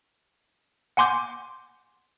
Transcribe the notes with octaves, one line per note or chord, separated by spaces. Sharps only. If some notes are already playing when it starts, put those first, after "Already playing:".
F#5 G#5 C6 D6 G6